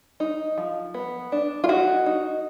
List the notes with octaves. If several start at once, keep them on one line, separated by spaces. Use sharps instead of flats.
D#4
F3
B3
D4
F4
D#4 F#4
D#4